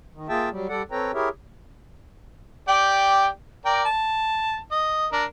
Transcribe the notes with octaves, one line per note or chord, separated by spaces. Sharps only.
D#3
A#3 F4 G#4 E5 G5 A5
F#3 G3
G3 A4 D5 F#5
C4 A4 B4 C#5 G5 A#5
E4 G4 G#4 A#4 C#5 E5
G4 D5 G5
A#4 D5 G5
A5
D#5
D4 A#4